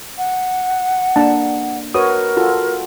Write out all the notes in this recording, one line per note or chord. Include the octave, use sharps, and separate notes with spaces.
F#5
A#3 D4 A5
F#4 A#4 B4 C#5 D#6
F4 F#4 A4